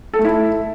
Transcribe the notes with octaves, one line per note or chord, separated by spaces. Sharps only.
A4
A3
E4